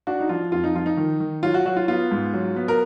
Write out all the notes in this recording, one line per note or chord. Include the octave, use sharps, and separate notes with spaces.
D4 F#4
D#4
F3 F4
F2 F4
D#4
F3 F4
D#4
D#3
D#3
F#3 F4
F#4
F#3 F#4
F4
B3 F4
G#2
F#3
B3
A#4